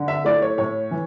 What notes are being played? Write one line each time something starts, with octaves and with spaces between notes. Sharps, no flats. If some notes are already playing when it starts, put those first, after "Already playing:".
Already playing: D3
E5
A3 E4 D5
C#5
A2 C#5
E3